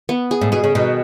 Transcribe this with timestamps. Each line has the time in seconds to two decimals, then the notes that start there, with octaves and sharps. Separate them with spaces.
0.09 B3
0.31 G#4
0.41 A2
0.52 B2 G#4
0.64 C#3
0.75 B2 D#3